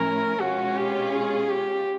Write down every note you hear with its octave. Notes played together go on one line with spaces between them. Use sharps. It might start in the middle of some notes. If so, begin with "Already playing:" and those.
Already playing: A2 F3 A3 C#4 E4 A#4
B2 G#3 C#4 F4 F#4
G4
G#4
G4